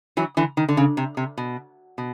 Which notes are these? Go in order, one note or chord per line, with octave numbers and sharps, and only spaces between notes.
E3 F#3
D3 E3
D#3
D3
C#3
C3
C3
B2
B2